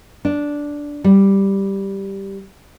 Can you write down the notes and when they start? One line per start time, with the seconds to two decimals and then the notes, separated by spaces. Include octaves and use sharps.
0.25 D4
1.04 G3